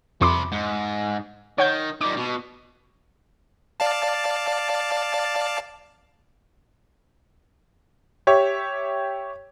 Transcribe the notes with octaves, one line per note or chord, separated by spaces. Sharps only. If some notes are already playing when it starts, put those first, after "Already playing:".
F2 C3 B5 C6 D6
G#2
D#3 C#5 F#5 G6
D#3 G3 D6
B2
D5 F5 A5
G4 C#5 E5